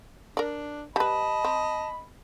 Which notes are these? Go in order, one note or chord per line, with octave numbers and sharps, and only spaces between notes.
D4 A#4 D5
G3 B4 D#5 A5 B5
C4